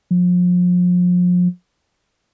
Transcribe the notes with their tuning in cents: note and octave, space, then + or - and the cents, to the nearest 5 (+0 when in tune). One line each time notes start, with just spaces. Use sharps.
F3 +35